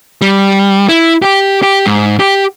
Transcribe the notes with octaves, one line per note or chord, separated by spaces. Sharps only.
G3
E4
G4
G4
G#2
G4